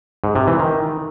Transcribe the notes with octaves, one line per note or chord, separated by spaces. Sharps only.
G#2
C3
E3
D#3